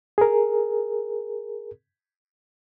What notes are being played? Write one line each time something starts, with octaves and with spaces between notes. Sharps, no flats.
G#4 A#4